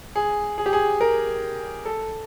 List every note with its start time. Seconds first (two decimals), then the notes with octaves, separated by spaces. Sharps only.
0.16 G#4
0.58 G#4
0.66 G4
0.73 G#4
1.01 A#4
1.85 A4